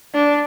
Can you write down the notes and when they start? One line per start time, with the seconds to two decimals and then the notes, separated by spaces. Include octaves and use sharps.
0.14 D4